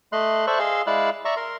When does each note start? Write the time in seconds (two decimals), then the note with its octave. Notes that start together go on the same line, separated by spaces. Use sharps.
0.12 A3 D#5 C6 F#6
0.47 A4 C5 D5 E5 C#6 F#6
0.59 G#4 D#5 F5 C6 E6
0.87 G#3 E4 D5 F5 E6 F#6
1.25 D5 E5 A#5 C#6
1.37 A#4 C6